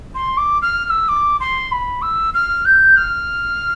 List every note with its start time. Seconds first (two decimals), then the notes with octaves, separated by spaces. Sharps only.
0.15 C6
0.37 D6
0.62 F6
0.85 F6
0.90 E6
1.08 D6
1.40 C6
1.71 B5
2.02 E6
2.34 F6
2.65 G6
2.96 F6